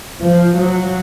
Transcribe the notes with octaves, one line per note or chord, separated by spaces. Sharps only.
F3
F#3